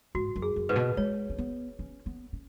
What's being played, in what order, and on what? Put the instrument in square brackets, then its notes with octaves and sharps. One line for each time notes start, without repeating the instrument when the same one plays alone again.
[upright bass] G#2 [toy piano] F#4
[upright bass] F#2
[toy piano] G#4
[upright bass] F#2
[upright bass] G#2 [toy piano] B4
[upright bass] B2
[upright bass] G#3 [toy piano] C#5
[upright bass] C#4
B3
C#4
B3
C#4